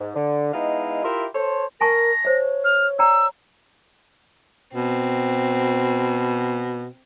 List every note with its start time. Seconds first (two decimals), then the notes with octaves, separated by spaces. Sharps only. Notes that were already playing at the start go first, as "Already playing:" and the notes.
0.01 G#2
0.15 D3
0.53 G#3 B3 D#4 E4 D#5 F5
1.04 E4 F4 G4 A#4 E5 C6
1.34 A4 C5 C#5
1.81 A#4 G#5 A5 C#6 A#6
2.25 C5 C#5 E5
2.64 F6
2.99 D5 G5 A#5 E6
4.75 B2 C4